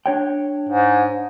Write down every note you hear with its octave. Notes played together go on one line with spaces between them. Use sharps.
D4 C#5 G5
G#2